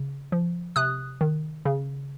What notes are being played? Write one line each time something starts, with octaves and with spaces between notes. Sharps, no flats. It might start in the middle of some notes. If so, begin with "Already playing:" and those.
Already playing: C#3
F3
C3 D#6 F#6
D#3
C#3